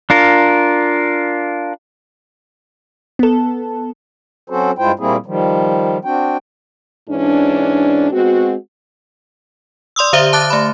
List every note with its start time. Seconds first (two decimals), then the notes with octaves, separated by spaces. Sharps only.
0.10 D4 F4 A#4
3.19 B3 A4
4.50 F#3 C4 C#4 F#4 A4 C5
4.78 G2 G#3 E4 F4 C5 G5
4.99 A#2 G3 A#3 C4 E4 G#4
5.26 D#3 F3 G3
6.05 C4 D4 F#4 G5
7.08 G#2 E3 C#4 D4
8.11 G#3 B3 C4 F#4
9.96 D5 C6 D#6 E6
10.13 D3 G4 C5 E5 D#7 G7
10.33 A5 D6 F#6 A6
10.50 A3 B5